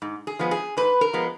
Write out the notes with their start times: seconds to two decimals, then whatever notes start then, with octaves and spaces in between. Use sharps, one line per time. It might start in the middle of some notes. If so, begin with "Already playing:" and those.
0.02 G#2
0.27 G#4
0.39 F3 G#3 B3
0.51 G#4
0.77 G#2 B4
1.01 A#4
1.13 F3 G#3 B3